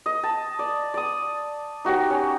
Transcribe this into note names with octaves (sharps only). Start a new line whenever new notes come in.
D#5
A5
D5
D5 D#6
D#4 F#4 G4 C#5
C#4